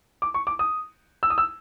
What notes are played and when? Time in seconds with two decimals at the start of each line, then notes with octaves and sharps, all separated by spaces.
0.22 D6
0.34 C#6
0.47 D6
0.59 D#6
1.23 E6
1.30 D#6
1.38 E6